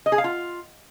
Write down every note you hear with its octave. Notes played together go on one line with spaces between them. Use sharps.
D#5
G#4
F5
F4